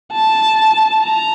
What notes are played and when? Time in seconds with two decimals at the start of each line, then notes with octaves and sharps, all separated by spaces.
0.13 A5
1.04 A#5